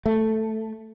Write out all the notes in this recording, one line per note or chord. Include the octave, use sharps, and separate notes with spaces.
A3